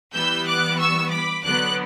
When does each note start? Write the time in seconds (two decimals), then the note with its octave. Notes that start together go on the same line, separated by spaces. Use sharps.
0.14 E3 G3 B3 E6 G6
0.47 D6 F#6
0.79 C#6 E6
1.11 B5 D6
1.43 D3 F#3 B3 D6 F#6